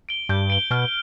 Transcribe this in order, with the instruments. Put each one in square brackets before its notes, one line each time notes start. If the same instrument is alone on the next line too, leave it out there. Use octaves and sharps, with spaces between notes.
[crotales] D7 G7
[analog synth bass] G2 [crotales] G6
[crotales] D7 G7
[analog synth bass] B2 [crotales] F6